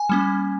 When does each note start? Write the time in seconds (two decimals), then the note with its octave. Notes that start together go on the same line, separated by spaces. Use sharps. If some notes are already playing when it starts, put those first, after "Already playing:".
Already playing: G#5
0.09 G3 A#3 C#4